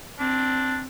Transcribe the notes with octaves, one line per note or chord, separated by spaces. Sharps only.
C4 D4